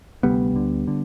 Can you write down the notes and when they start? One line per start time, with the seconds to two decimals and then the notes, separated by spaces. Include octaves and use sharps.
0.23 D2 C3 G3 B3
0.54 D2 D3
0.88 D3